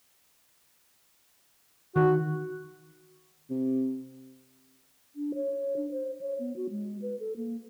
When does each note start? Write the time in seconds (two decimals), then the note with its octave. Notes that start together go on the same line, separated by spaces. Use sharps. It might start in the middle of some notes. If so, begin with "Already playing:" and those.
1.96 D#3 F#4
3.50 C3
5.16 D4
5.35 C#5
5.77 D4
5.91 C5
6.21 C#5
6.39 B3
6.56 F#4
6.70 G#3
7.02 B4
7.20 A4
7.37 A#3